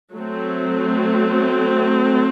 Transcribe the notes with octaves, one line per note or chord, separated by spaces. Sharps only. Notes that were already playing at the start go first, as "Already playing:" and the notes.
F#3 A3 C4